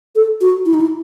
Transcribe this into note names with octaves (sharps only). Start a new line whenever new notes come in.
A4
F#4
E4
D#4
E4